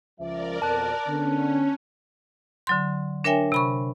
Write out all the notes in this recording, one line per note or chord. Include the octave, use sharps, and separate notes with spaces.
C#2 F3 A#4 D5 E5
F2 B2 A5 F#6
D3 B3 C#4 D4
D3 F#3 C6
D4 A#4 C#5 E5 G5 G#5
C3 B5 C#6